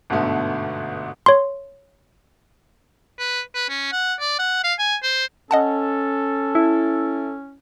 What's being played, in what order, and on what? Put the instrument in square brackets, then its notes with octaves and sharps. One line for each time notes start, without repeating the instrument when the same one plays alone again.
[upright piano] G1 G#2 B2 D3 A3
[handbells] C#5 C6
[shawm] B4
B4
C#4
F#5
D5
F#5
F5
G#5
C5
[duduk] C#4 [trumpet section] A4 [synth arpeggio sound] D#5 F#5 A5
[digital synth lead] E4